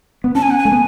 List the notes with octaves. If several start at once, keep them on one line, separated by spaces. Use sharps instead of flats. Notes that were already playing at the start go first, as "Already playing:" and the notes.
B3
C#4 A5
G#5
F#5
G#5
A3
B3